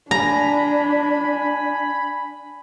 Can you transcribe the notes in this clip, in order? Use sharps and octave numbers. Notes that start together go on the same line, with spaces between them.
D4 G#5 A#5 B5